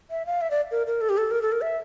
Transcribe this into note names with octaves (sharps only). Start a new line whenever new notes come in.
E5
F5
E5
D5
A#4
A#4
A4
G4
A4
A#4
A4
A#4
E5